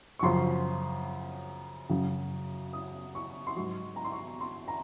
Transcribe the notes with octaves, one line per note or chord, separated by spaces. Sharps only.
C#6
F#2 C#3 F3 C6
F#2 C#3 F#3
D#6
C#6
C6
G#2 F#3 C#6
A#5
C6
C#6
C6
A#5